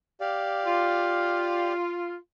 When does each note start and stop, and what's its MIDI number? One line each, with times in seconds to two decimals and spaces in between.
0.20 1.72 67
0.20 1.72 74
0.20 1.72 77
0.66 2.16 65